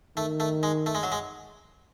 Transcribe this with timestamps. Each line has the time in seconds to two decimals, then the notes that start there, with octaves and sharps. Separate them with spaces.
0.17 D#3 A3
0.40 A3
0.63 G#3
0.86 A3
0.95 G#3
1.03 F#3
1.12 G#3